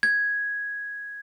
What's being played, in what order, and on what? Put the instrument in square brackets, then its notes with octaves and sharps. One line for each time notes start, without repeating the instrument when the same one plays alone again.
[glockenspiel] G#6